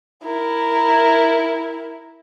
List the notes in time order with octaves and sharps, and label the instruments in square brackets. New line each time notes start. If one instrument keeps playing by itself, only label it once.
[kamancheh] E4 A#4